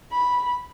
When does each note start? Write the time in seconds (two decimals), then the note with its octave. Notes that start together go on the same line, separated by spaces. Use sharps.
0.12 B5